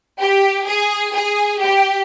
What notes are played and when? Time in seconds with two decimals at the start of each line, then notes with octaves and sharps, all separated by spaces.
0.19 G4
0.66 G#4
1.13 G#4
1.60 G4